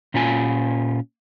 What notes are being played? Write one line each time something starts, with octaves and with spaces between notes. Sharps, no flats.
A#2 C#4 F4 G#5